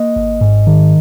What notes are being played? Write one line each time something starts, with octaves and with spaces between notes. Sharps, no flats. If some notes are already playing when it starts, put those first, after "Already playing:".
Already playing: A#3 D#5
G#1
G#2
D#3